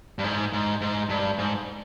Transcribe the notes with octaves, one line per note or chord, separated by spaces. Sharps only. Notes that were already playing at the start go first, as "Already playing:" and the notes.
G2
G#2
G#2
G#2
G2
G#2